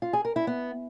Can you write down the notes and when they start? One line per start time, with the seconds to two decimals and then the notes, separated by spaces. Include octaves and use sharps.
0.02 F4
0.13 G#4
0.25 A#4
0.36 E4
0.47 B3